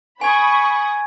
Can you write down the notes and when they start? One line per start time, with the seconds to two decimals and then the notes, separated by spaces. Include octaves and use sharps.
0.21 G#5 B5 C#6 D#6 G#6